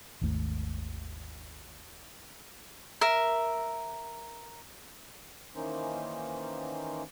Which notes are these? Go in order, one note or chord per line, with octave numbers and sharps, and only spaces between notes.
G#1 D#2 G#2 A3
A#4 E5
D#3 E3 A#3 C#4 D#4 C5